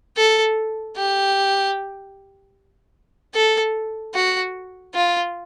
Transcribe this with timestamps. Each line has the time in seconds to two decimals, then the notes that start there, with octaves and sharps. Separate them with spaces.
0.16 A4
0.96 G4
3.35 A4
4.15 F#4
4.94 F4